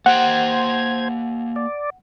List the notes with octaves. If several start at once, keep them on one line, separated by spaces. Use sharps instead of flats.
A#3 G4 C5 F#5 G5 G#6
D5